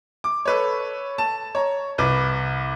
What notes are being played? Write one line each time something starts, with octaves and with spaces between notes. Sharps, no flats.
D6
A4 B4 C#5
A5
C#5 A#5
C2 B4 D6